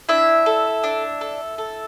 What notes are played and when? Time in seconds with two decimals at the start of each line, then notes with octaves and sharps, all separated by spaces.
0.09 D4 E4 E5
0.46 A4
0.84 D4
1.21 A4
1.58 A4